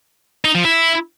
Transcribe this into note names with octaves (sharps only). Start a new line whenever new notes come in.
D#4
F3
E4